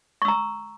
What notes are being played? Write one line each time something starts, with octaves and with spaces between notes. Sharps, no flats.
A#5 C#6 E6